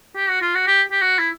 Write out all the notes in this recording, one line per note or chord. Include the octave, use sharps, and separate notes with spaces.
G4
F#4
F4
F#4
G4
G4
F#4
E4